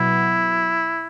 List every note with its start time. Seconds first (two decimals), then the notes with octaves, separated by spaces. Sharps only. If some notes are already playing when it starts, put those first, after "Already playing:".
Already playing: B2 F#3 B3 E4